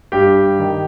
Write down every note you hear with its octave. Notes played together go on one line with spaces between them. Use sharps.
G2 G4
D#3